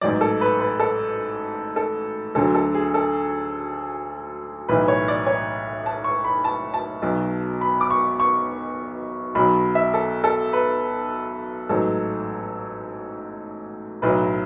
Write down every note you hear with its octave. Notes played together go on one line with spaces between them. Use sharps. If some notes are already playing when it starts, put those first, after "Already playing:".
A1 G#2 F#3 D5
A4
B4
B4
A4
A4
D2 D3 F#3 A4
A4
G#4
A4
B1 A2 E3 B4
C#5
D5
C#5
A5
C#6
B5
A5
A5
B1 B2 F#3
B5
D6
C#6
C#6
B1 B2 F#3 B5
E5
A4
A4
B4
A1 G#2 F#3 A4
B1 A2 F#3 B4